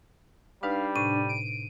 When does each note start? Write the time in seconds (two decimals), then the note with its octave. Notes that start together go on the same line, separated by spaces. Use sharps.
0.63 G3 D4 D#4 B4 F5
0.96 A2 C3 D4 D#7
1.29 D7